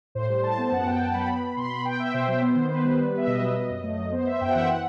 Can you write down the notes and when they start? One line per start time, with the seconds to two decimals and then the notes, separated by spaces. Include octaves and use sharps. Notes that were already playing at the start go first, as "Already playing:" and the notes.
0.15 A2 C5
0.29 G3 C5
0.43 A2 A5
0.58 B3
0.72 F#2 F#5
0.86 F#2 G5
1.00 F#2 A5
1.14 F#3 B5
1.28 B3
1.42 B3
1.56 B2 C6
1.71 B3 B5
1.85 B3 G5
2.00 B3 E5
2.14 B2 C5
2.28 F#3
2.42 B3
2.56 D#3
2.70 B3 B4
2.85 G3
2.99 B3
3.13 B3 E5
3.27 B2 D#5
3.42 F#3
3.56 F#3
3.70 F#2
3.83 A3
3.98 F#3
4.12 B3 C5
4.27 B3 E5
4.41 F#2 G5
4.49 F#5
4.55 E3 E5
4.67 F#5